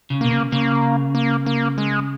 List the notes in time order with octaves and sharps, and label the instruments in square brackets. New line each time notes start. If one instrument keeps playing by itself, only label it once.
[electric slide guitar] C#3
[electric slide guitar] B2 [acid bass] A#3
[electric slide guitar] C#3
[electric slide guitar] C#3 [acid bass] A#3
[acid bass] A#3
A#3
G#3